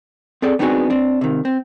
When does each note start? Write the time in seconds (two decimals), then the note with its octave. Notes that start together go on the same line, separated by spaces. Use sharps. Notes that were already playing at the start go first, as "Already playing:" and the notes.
0.42 C4 G#4 A4 D5
0.59 B3 C4 D4 D#4 F#4 G#4
0.90 C4 D4
1.21 C3 D#3
1.45 C4